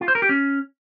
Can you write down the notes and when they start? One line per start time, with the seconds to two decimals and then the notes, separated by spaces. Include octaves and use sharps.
0.01 F4
0.08 C5
0.15 A#4
0.22 G4
0.29 C#4